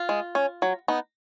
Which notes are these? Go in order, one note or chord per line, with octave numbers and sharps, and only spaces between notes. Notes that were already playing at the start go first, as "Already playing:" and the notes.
Already playing: F4
G#3
C#4
F#3
B3 D#4